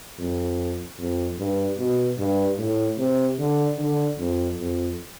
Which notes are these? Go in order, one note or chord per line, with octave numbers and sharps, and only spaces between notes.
F2
F2
G2
B2
G2
A2
C3
D3
D3
F2
F2